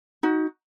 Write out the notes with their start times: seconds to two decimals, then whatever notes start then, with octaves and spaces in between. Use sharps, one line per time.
0.23 D#4 F#4